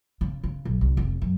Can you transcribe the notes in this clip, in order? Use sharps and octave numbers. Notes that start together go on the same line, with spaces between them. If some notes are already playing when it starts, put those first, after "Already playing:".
C#3
C#3
B1
C2
F1
F#2